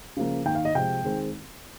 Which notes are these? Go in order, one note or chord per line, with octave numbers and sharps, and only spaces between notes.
C#3 F3 A#3
D#3 A#3 G5
F5
D#5
C3 F3 G#3 C4 G5
D#3 G#3 C4